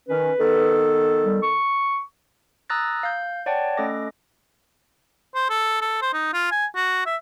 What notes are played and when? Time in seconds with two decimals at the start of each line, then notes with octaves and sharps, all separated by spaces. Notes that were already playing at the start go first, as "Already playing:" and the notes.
0.08 D#3 C#4 B4
0.39 D#3 B3 A4
1.24 G3
1.42 C#6
2.70 A#5 D#6 E6 F#6 A6 A#6
3.03 F5 G6
3.46 C#5 D5 F#5 G5 A5
3.77 A3 C#4 A4 D#5 D6 A#6
5.35 C5
5.50 A4
5.81 A4
6.02 C5
6.13 D#4
6.33 F4
6.51 G#5
6.76 F#4
7.06 E5